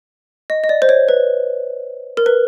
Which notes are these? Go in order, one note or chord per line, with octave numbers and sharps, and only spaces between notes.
D#5
D#5
D5
C5
C#5
B4
A#4
B4